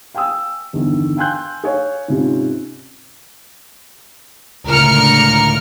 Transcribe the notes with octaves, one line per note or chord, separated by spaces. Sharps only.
F5 G5 G#5 D#6 E6
G1 E2 D#3
F5 G5 G#5 C6 F#6 G6
G#4 C#5 F5
G#2 C3 C#4 F4
C#2 A2 D3 A#4 F6 C#7